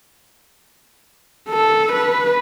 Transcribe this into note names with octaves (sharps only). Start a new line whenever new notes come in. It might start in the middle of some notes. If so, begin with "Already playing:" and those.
A4
B4